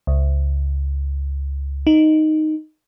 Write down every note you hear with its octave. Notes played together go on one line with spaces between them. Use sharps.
C#2
D#4